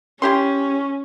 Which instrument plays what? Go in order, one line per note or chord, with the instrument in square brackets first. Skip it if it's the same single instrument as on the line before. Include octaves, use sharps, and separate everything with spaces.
[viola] C#4 [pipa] E4 G4 C6